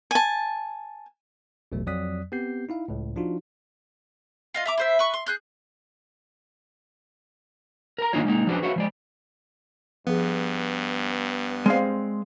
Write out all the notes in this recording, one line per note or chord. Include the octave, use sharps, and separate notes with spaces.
G#5 A5
A1 E2 B2 F#3 A3
F2 F#3 D5 D#6 F#6 B6
B3 C4 G4 G6 C7
D#4 E4 F5
C#2 A2
F3 D4 D#4 F4 F#4
F4 D#5 F5
E5 A#5 D6
E4 C5 E5
B4 C#6
C6
G#4 F#6 G6
A#4 A#5
D#3 A#3 D4 D#4 F4 C#5
G#3 A#3 C#4 D#4
F3 G3 C#4 D4 F#4 B4
F#4 B4 C#5 E5 F5
F3 G#3 D5
G2 F3 B3 G#4
G#3 C4 C5 D5 F5 F6